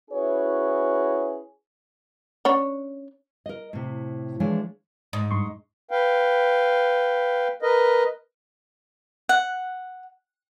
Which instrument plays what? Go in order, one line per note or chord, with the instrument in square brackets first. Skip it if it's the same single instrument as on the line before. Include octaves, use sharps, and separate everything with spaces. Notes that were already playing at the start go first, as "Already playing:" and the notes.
[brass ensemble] C#4 E4 F#4 G#4 B4 C#5
[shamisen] C#4 D4 C#5
[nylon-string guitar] A#4 D#5
A2 C3
E3 F3 G#3 D4 C#5 G#5
[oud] G#2
[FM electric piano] G2 C6 C#6
[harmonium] B4 F5 G5
A#4 B4 D#5
[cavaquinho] F#5